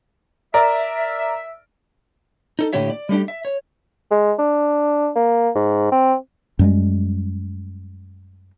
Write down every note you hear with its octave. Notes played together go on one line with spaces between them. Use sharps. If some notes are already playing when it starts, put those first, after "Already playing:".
A#4 D5 E5
D#4 A4
A2 D3 A#3 G4 C#5 E5
D5
G3 A3 D4 G4
E5
C#5
G#3
D4
A#3
G#2
C4
F#2 G3 G#3